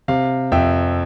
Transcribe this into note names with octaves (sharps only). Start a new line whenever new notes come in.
C3 F5
F2 E5 G5